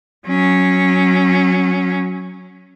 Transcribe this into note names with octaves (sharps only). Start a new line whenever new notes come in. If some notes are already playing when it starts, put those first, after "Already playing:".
F#3 C#4